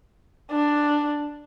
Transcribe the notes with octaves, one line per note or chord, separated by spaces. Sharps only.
D4